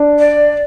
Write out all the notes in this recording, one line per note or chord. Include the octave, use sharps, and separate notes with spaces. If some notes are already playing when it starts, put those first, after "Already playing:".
Already playing: D4
D5